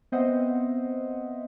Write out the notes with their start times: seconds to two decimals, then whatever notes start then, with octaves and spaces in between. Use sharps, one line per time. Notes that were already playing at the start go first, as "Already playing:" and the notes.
0.12 B3 C4 C5 D#5 E5 F#5